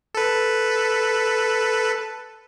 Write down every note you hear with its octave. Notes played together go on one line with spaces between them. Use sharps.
A4 B4